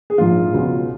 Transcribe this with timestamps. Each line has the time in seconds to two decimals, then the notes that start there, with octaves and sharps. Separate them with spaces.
0.10 G#4
0.18 A#1 G#2 F3 F4
0.53 C#2 B2 F#3